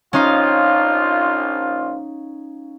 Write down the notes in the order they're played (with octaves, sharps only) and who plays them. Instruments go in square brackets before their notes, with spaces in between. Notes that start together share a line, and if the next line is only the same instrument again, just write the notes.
[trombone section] A#1 F4 [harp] C#4 D#4 F5